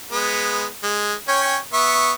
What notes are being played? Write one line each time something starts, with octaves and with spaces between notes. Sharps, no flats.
G#3 B3
G#3
C#4 C#5 G5
B3 E5 C#6